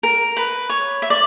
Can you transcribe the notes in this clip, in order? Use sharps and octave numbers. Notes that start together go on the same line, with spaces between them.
A#4
B4
C#5
E5
D5